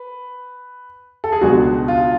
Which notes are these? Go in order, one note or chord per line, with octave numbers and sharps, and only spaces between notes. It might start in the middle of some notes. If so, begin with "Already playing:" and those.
Already playing: B4
A4
G#4
C#2 B2 G#3 D4 F#4
F4